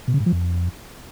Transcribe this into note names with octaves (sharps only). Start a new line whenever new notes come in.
B2
C#3
G#2
F3
F2